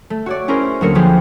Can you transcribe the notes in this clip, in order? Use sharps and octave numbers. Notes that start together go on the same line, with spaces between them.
A3
F#4 C#5 D5
C#4 E4 G#4 A#4 C5
D2 F#3 A#3 A#4 C#7
F3 A#3 G4 G#4 B4 C5